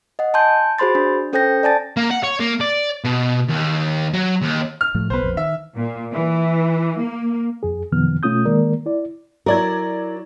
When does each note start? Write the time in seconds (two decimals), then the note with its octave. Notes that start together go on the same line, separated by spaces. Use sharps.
0.19 D#5 F#5
0.34 G#5 A5 C6 G6
0.78 F#4 G#4 C5 B5 C6 A6
0.95 D4
1.33 C#4 A4 C5 G5 G6 A#6
1.63 D5 G#5 A5 A6
1.97 A#3
2.11 F#5
2.23 C#5
2.40 A#3
2.61 D5
3.04 B2
3.48 D#2
4.13 F#3
4.42 D#2
4.81 F6
4.95 A2 F3 A3
5.10 B1 E3 B3 B4 C5
5.23 A#1 F2
5.37 D#3 E5
5.76 A#2
6.11 E3
6.98 A#3
7.63 F2 G#4
7.92 F#2 C3 D#3 F3 B3 F6
8.23 B2 A3 C#4 F4 D#6 G6
8.45 D#3 G#3 A#3 A#4 D5
8.86 E4 D5
9.46 F#3 E4 A#4 D5 G#6